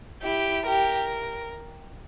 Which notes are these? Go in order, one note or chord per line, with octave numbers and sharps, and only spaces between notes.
E4 G4
G4 A#4